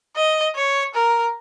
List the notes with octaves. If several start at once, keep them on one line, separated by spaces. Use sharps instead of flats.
D#5
C#5
A#4